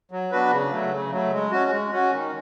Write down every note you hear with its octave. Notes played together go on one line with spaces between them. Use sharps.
F#3
B3 D4 F#4 B4
C#3
F#3 A3
C#3
F#3 A3
G#3
C#4 F#4
G#3
C#4 F#4
D#3